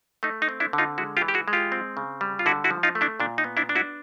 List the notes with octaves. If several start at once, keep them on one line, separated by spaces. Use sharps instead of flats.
A3 D#4
D#4
C4
D4 E4
D3
D#4 F4
G#3 E4 F#4
F4 G4
E3
G4
F#4 G#4
G#3
F4 G4
C4
C#3
G3
F4
D3 E4 F#4
E4 F#4
F3
D#4 F4
A3
D4 E4
A#2 D4
D#4
B3
D4 E4
D4
E4 F#4